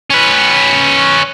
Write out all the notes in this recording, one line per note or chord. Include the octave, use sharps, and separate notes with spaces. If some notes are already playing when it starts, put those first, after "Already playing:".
C#4 B4